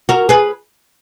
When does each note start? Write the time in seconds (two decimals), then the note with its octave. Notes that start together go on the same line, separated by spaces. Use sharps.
0.09 F#4 A#4
0.29 G#4 B4